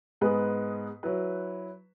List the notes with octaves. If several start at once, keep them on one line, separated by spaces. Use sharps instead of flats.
G#2 G#3 B3 G#4 B4
F#3 E4 B4